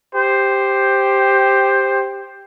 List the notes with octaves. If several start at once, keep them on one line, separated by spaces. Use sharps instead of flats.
G4 C5